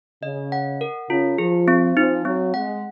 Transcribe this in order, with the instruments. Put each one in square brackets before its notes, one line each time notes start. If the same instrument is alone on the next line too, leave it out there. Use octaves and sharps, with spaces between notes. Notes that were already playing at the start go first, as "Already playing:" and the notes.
[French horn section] C#3 [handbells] D#5
[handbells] F#5
A#4
[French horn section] C#3 [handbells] F4
[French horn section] F3 [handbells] G#4
[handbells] C4
[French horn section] F3 [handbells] D#4
[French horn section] F#3 [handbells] C4
[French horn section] G#3 [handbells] F#5